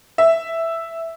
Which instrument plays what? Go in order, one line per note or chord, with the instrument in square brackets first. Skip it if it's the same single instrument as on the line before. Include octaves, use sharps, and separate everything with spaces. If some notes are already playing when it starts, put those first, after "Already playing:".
[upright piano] E5